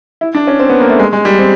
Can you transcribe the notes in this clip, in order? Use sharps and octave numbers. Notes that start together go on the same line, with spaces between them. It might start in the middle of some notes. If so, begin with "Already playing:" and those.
E4
D4
C#4
C4
B3
A#3
A3
G#3
G#3
G3
C4